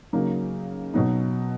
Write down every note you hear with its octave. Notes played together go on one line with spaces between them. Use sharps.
C#3 F#3 A#3 D#4
B2 F#3 B3 D#4